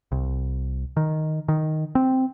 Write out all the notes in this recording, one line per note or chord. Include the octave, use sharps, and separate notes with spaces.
C2
D#3
D#3
C4